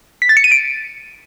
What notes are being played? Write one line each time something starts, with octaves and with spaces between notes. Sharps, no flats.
B6
A6
C#7
D#7
D7